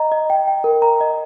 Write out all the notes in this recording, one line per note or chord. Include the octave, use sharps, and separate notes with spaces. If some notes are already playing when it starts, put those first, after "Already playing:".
Already playing: D#5 A#5
D#5
G5
G5
A#4
A#5
D#5